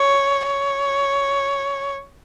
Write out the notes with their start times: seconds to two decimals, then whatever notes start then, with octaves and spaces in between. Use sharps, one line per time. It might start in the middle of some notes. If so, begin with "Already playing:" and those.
Already playing: C#5
0.47 C#5